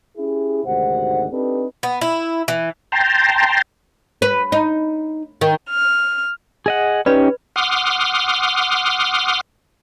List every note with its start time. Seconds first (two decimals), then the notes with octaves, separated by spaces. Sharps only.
0.17 C#4 E4 G4 G#4
0.64 G#1 D2 G#2 C3 C5 F#5
1.31 C4 D4 D#4 G4 A4 B4
1.83 B3
2.01 E4
2.48 E3
2.92 G5 A5 A#5 C6
4.22 B4
4.52 D#4
5.41 D#3
5.69 F6
6.66 G#4 D#5 F#5
7.06 C#4 D#4 G4 B4 D5 B5
7.56 F#5 C6 D6 D#6 F6